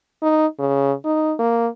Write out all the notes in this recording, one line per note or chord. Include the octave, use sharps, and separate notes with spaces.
D#4
C#3
D#4
A#3